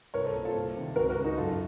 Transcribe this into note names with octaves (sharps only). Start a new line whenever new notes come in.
C2 A#4 C#5
A4 C5
A#2
F4 A4
C2
C3 D#3
C#2 F#4 A#4
F#4 A#4
C#3
D#4 F#4
F#2 F4 A4